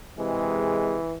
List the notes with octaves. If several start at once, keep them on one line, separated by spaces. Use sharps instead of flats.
C3 E3 G#3